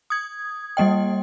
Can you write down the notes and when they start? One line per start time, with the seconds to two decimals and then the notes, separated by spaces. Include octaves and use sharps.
0.10 D#6 G#6
0.77 G3 A#3 D#5 G5